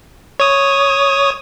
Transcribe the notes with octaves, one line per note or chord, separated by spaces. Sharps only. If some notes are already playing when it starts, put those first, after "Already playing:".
C#5 D#6